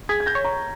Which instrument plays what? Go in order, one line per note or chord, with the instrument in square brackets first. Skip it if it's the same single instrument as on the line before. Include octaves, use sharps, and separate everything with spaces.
[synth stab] G#4 [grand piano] G#6 B6
[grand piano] G#6
G6 A#6
[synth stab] C#5
[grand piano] A#5 C#6